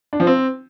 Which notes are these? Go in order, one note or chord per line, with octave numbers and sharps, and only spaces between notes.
D4
F3
C4